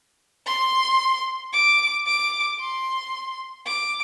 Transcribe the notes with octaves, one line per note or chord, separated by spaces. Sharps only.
C6
D6
D6
C6
D6